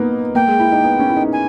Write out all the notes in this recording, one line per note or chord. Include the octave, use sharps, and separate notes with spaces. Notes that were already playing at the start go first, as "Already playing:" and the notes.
Already playing: A#3 B3 D#4
A#3 G5
G#3
E4
D#4
B3
C#4
E4
D#4
G#5